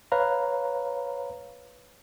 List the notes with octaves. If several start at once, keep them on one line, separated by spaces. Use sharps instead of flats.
B4 C#5 F5 A#5